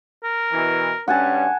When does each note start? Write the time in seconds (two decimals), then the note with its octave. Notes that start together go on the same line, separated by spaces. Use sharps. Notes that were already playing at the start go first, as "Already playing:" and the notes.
0.24 A#4
0.52 B2 E3
1.08 G2 C#4 F#5 G#5 A5